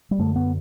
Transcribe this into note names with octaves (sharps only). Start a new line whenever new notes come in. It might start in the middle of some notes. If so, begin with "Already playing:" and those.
G3
F#2 D3 A3
B3